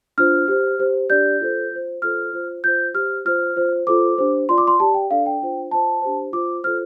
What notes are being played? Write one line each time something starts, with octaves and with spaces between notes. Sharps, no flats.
D4 F4 C5 F6
G4 C5
G4 C5
D4 G4 D5 G6
F4 A4 C5
F4 C5
F4 A4 C5 F6
F4 C5
F4 C5 G6
G4 C5 F6
F4 C5 F6
F4 C5
F4 A4 C5 D6
D4 G4 C5
F4 D5 C6
D6
C6
G4 D5 A5
G5
D4 A4 D5 F5
G5
D4 F4 C5
F4 C5 A5
D4 G4 C5
F4 C5 D6
F4 A4 C5 F6